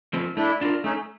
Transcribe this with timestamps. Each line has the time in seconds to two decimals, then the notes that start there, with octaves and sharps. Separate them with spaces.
0.13 F3 A3 C4
0.37 A3 D4 E4
0.61 D4 F4 A#4
0.84 A3 C#4 D#4